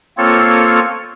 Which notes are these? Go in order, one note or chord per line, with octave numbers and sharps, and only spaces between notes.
A#3 C4 F4 A4 C#5